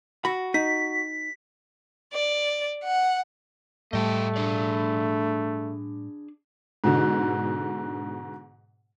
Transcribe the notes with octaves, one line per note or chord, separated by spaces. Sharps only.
F#4 B5
D#4 B6
D5
F#5
A2 G3 A3 D#5 G5 A5
D4 G#4 D5
G#2 B2 D3